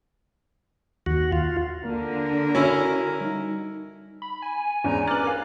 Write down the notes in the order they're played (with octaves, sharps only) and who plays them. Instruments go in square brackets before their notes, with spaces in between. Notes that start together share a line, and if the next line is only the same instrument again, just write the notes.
[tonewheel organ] D#2 F#4
F4
[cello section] D3 [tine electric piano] A#3 [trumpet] A#4
[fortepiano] C#4 E4 [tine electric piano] F#4
[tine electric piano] G3 D#4
[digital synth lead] B5
G#5
[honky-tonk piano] E2 G#2 [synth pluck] C#4 [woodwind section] D4 A#5
[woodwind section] G2 D6 [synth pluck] F6 F#6 [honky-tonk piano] A6
[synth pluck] A#4 F5